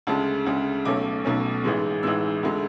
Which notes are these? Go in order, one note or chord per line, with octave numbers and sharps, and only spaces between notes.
D2 C#3 G#3 A5
D2 C#3 G#3
B1 B2 A3 C#4 D6
B1 B2 A3 C#4
A1 G#2 E3 G#3
A1 G#2 E3 G#3 E6
D2 D3 G#3